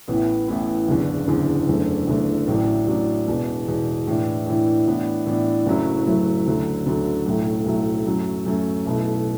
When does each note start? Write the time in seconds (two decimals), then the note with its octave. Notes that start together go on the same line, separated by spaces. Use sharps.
0.08 A1 A2 E3 B3 E4
0.48 A1 A2 E3 B3 E4
0.88 F#1 E2 D3
1.28 F#1 E2 D3
1.68 F#1 E2 D3 A3
2.07 F#1 E2 D3 A3
2.48 A1 A2 F#3 D4
2.87 A1 A2 F#3 D4
3.28 E1 E2 B2
3.67 E1 E2 B2
4.07 A2 E3 D4
4.46 A2 E3 D4
4.87 A2 E3 B3 D4
5.27 A2 E3 B3 D4
5.66 F#1 F#2 F#3 A3 E4
6.07 F#1 F#2 F#3 A3 E4
6.46 D2 D3 F#3 A3
6.86 D2 D3 F#3 A3
7.26 B1 A2 F#3 A3
7.66 B1 A2 F#3 A3
8.06 F#2 F#3 A3
8.46 F#2 F#3 A3
8.86 B1 B2 A3 E4